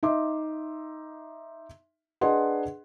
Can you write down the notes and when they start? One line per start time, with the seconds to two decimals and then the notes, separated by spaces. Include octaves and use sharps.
0.03 D#4 E5 C6 D6
2.21 D4 G#4 B4 D#5 F#5 C6